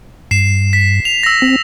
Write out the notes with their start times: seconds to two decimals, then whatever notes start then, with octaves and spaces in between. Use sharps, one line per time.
0.31 G2 C7 E7
0.73 B6
1.05 F7
1.23 E6 A#6
1.42 C4